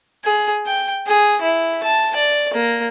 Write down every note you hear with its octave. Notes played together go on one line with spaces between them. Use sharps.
G#4
G5
G#4
E4
A5
D5
A#3